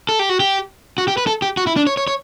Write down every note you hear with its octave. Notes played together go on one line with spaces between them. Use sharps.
A4
G4
F#4
G4
F#4
G4
B4
A4
G4
F#4
E4
D4
C#5
C#5
C#5